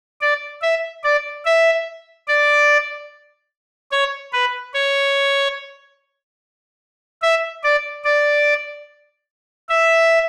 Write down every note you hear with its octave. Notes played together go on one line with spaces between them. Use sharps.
D5
E5
D5
E5
D5
C#5
B4
C#5
E5
D5
D5
E5